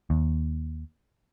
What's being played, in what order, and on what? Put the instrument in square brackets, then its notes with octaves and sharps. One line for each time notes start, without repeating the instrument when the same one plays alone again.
[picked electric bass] D#2